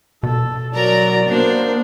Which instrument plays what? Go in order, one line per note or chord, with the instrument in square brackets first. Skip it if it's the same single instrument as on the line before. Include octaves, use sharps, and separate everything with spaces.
[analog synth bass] B2 [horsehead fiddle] A4
[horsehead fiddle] F#3 D5 [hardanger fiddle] A#4 A#5
[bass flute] A#3 [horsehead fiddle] B3 C5 [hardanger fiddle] D4